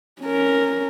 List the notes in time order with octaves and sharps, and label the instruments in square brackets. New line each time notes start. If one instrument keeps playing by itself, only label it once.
[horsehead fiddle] C#4 A#4